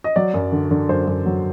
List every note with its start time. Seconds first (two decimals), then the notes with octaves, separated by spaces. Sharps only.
0.04 D#5
0.16 F#3 D5
0.34 F#2
0.52 D3
0.71 D3
0.89 F#2 C5
1.07 F#2
1.26 F#3